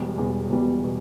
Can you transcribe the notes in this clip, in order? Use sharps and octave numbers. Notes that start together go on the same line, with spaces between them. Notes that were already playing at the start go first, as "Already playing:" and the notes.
Already playing: E1 E2 B2 G3
E1 E2 B2 G3
E1 E2 B2 G3
B2